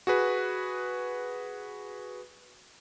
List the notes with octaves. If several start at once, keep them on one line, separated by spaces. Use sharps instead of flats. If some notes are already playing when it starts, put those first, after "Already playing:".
F#4 G#4 B4